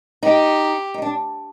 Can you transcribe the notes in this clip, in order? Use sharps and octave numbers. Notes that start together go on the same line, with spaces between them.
D#4 G4
D#4
D4